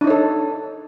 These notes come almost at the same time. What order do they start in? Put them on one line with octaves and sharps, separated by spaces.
D4 D#4 C#5 A4